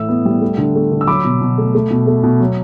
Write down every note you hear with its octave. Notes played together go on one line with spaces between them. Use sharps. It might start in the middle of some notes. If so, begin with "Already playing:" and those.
Already playing: A2 E3 E6
B3
G3
A3
D3
A3
D3
E6
F#3 B5 D6
B2
B2
A3
A3
B2
A3
B2
F#3